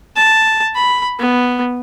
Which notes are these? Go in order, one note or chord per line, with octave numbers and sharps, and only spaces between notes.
A5
B5
B3